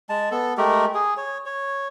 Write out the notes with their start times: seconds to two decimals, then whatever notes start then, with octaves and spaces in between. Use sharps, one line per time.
0.09 G#3 A5
0.32 B3 A4
0.58 G#3 A3 G4 A#4
0.94 G#4
1.17 C#5
1.46 C#5